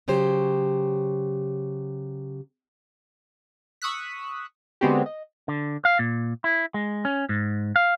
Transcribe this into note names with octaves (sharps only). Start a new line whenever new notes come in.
C#3 F#3 G4 C5
C#6 D#6 E6 F#6 B6
D3 G#3 B3 C4 F#4 G4
D#5
D3
F5
A#2
E4
G#3
C#4
G#2
F5